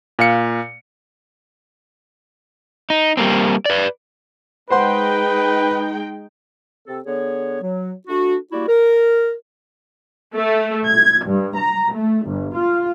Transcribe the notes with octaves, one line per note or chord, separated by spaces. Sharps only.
A#2 F5 C#7
D#4
G3 A#3 C4
B4 D5
G#3 D#4 B4 C5 F#5 G5 C6
C3 C4 A4
D3 B3 G#4 C#5
F#3
A3 D4 F#4
G3 A#3 E4 F#4 D5
A#4
A3
G#6
G2
A#5
A3
G1
F4